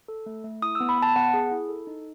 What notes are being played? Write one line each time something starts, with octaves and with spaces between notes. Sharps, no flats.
A4
A3
A3
E4 D#6
E6
B3
B5
B3 A5
B3 F#5
G#4
E4
A4
D#4